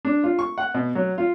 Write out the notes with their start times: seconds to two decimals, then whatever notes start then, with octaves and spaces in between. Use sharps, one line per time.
0.05 D4
0.24 F4
0.39 C#6
0.58 F#5
0.74 B2
0.95 F#3
1.18 F4